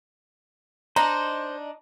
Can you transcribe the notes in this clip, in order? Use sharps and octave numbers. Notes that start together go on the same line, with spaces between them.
D4 D#4 C5 A#5